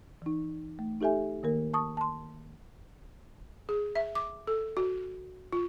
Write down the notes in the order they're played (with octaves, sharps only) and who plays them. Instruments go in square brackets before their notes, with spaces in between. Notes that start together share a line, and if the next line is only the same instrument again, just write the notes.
[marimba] E3 D#4
A3
D#4 G4 A4 E5 G#5
D#3 A#3 A#4
A5 C#6 D#6
A5 C6
[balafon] G#4
E5
D6
A4
F#4
F4